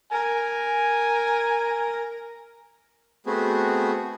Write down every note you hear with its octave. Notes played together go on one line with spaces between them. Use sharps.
A#4 G#5
A3 B3 C4 F#4 G#4